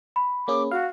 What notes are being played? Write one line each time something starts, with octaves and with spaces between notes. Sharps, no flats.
B5
A#3 C#4 G#4 D6
F#4 F5